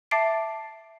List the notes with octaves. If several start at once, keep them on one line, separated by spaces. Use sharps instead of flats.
E5 A5 D6 A6 C7 D7